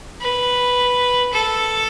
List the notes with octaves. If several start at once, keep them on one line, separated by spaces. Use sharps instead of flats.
B4
A4